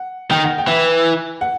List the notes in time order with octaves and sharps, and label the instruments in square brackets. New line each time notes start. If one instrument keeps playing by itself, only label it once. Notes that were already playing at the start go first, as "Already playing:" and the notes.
Already playing: [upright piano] F#5
[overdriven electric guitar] D#3 [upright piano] G5
[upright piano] F#5
G5
[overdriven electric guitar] E3
[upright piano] F#5